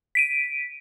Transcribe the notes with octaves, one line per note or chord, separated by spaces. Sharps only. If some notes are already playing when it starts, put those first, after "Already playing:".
B6 D7 D#7